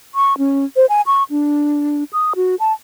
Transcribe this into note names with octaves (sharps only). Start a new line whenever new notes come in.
C#6
C#4
C5
G#5
C#6
D4
D#6
F#4
A5